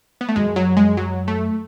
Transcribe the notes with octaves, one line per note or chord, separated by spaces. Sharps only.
B3
A3
F#2 G#3
F#3
G#3
F#3
A3